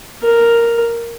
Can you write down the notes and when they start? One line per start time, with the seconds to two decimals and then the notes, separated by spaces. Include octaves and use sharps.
0.23 A#4